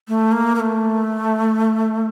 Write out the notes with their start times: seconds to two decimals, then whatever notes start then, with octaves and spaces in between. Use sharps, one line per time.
0.08 A3
0.32 A#3
0.55 A#3
0.60 A3